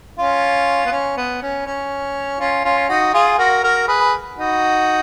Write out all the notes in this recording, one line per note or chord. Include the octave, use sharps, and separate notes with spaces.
C#4 F4
B3
C#4
B3
C#4
C#4
C#4 F4
C#4 F4
D#4 F#4
F4 G#4
F#4 A#4
F#4 A#4
G#4 B4
D#4 F#4